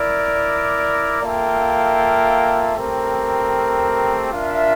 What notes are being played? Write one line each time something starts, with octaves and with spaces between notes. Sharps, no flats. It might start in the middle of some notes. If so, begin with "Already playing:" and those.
Already playing: E4 A#4 D5
A#3 F4 A4 E5 G5
A3 C4 G4 A#4
D4 F4 A#4 E5